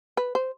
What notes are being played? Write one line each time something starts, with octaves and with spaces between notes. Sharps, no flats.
B4
C5